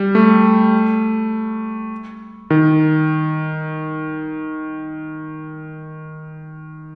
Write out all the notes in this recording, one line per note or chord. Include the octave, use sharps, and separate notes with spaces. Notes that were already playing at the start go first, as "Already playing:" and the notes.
Already playing: G3
A3
D#3